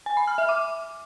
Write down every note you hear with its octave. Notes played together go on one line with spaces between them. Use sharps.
G#5
B5
F6
E5
D6